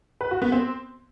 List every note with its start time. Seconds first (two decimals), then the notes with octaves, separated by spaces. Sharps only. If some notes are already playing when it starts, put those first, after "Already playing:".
0.21 B4
0.31 F#4
0.42 B3
0.52 C4